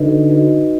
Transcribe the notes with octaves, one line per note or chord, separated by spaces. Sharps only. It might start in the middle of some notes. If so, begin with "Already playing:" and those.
Already playing: D3 D#4 F#4 B4 D#5
D#4 F#4 B4 D#5